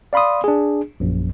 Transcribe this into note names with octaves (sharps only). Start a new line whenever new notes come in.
D5 F5 B5 C6 D#6
D4 G#4
A#1 F#2